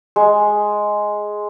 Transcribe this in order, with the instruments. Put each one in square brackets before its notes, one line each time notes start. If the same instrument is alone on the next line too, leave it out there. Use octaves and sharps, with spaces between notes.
[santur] G#3